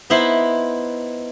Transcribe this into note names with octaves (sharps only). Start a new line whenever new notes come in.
B3 D#4 E4 C5